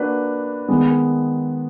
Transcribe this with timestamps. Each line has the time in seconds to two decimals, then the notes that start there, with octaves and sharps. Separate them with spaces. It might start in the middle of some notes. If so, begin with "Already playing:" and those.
Already playing: A#3 D4 F#4 B4
0.68 D#3 G#3 B3